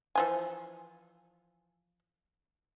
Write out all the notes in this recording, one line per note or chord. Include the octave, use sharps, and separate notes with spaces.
E3 F3 G#5